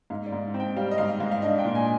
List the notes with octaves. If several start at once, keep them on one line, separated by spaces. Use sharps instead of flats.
G#2 F5
D5
G#2
C4
G5
G3 F5
D#5
G#2 F5
G#2 F5
F5
D4 D#5
G5
A#2
G#5